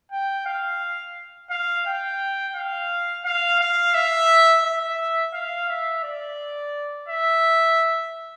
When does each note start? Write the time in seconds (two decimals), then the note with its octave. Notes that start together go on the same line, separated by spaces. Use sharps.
0.12 G5
0.46 F5
1.50 F5
1.86 G5
2.56 F5
3.25 F5
3.60 F5
3.94 E5
4.64 E5
5.34 F5
5.69 E5
6.04 D5
7.09 E5